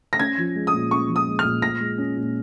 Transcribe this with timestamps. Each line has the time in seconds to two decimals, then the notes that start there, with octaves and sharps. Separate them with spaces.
0.13 A#6
0.19 C#4 G#6
0.38 F3
0.55 G#3
0.67 D#6
0.73 A#2
0.91 C#4 C#6
1.09 F3
1.16 D#6
1.28 G#3
1.39 F6
1.44 A#2
1.62 A#2 A#6
1.80 G#3
1.98 C#4
2.16 A#2